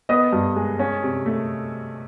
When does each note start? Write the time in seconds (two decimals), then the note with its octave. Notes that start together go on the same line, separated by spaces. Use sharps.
0.09 B3 D#5 D#6
0.33 G2
0.56 G#3
0.79 C#4
1.03 C3
1.26 A3